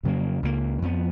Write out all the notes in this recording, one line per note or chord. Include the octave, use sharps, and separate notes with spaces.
F2 C#3 F#3 A#3
C#2 C#3 F3 A#3
F2 F3 B3